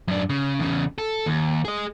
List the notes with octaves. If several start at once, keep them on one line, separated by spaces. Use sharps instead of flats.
F#2 D4
C#3
E2 C#3
A4
D#2
G#4 D#5